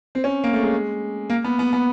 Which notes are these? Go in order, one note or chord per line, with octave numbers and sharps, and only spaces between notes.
C4
C#4
A#3
A3
G#3
A#3
B3
B3
B3